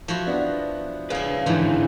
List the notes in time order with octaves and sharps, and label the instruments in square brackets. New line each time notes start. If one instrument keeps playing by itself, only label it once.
[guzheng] F3 E4 F#4
[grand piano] B3 D4
[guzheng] C#3 E4 [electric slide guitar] B4 F5
[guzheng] G#2 E3 F3 [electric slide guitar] D3 E4